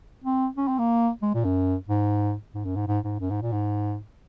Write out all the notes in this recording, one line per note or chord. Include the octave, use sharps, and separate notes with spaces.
C4
C#4
C4
A#3
G#3
A#2
F#2
G#2
G#2
F#2
G#2
G#2
G#2
F#2
G#2
A#2
G#2